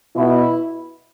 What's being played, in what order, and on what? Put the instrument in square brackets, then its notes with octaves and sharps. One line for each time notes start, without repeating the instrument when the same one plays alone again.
[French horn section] B2 E4